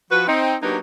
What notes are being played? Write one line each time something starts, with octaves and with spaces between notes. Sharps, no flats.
F3 F#4 B4
C4 D#4
F#3 A#3 B3 D4 D#4 G4